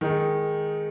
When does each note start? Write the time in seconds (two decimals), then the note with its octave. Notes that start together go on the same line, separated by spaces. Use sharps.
0.01 D#3 G#3 D#4